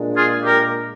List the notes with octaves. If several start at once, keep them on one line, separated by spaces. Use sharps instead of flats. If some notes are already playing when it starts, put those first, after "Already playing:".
Already playing: A#2 G#3 D4
F4 G#4
G4 A#4